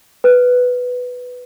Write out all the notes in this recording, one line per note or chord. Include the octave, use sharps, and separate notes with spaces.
B4